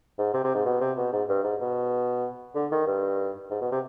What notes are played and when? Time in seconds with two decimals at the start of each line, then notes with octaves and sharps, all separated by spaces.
0.18 G#2
0.34 C3
0.44 C3
0.54 G#2
0.65 B2
0.81 C3
0.97 B2
1.12 G#2
1.29 G2
1.44 G#2
1.61 B2
2.55 D3
2.72 D#3
2.87 G2
3.51 G#2
3.61 B2
3.72 C3